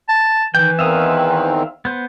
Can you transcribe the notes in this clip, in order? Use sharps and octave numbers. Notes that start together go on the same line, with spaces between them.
A5
D#3 E3 G5
E2 D#3 C4 E5 F5 D#6
B3 C5